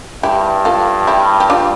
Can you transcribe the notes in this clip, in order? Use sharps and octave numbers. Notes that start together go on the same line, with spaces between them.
G2 E4 G4
F4 A4
E4 G4
G4
D4 F4